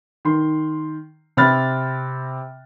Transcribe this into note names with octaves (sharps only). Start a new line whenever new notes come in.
D#3 C6
C3 C4 B5 F6 F#6 A6